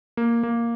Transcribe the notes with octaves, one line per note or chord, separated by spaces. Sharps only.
A#3
A#3